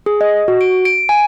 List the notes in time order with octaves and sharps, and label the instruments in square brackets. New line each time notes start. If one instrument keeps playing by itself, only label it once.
[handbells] G#4
D#5
F#4
D7
D7
G#5